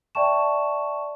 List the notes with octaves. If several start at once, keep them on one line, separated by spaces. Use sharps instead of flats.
D5 E5 G5 A5 C#6 E7